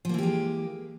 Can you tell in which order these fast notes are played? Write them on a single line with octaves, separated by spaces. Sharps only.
F3 A#3 E3 G4 G#3